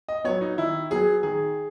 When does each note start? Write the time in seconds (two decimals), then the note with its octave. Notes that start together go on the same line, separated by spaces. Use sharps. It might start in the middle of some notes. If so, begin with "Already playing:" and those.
0.08 D#5
0.24 F#3 B3 C#5
0.41 D#4
0.58 D#3 E4
0.90 F#3 B3 G#4
1.23 D#3 G#4